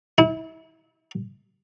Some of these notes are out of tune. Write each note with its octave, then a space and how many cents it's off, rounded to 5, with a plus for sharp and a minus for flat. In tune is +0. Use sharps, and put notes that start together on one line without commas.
E4 -35